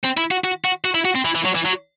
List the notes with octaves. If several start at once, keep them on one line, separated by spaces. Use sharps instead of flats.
C4
E4
F#4
F#4
F#4
F#4
E4
F#4
C4
E3
E3
F#3
E3
F#3